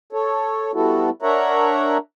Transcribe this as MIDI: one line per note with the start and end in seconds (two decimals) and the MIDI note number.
0.13 0.71 69
0.13 0.71 73
0.74 1.10 55
0.74 1.10 59
0.74 1.10 64
0.74 1.10 66
0.74 1.10 69
1.22 1.97 62
1.22 1.97 70
1.22 1.97 73
1.22 1.97 76
1.22 1.97 78
1.22 1.97 82